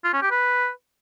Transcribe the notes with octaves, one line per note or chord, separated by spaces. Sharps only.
F4
C#4
G4
B4